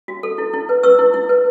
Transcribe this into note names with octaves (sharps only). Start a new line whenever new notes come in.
F#4
A4
E4
E4
B4
B4 C#6 E6
E4
E4
B4